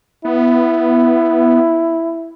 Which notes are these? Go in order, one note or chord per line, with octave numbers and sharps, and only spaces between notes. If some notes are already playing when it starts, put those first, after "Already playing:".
B3 E4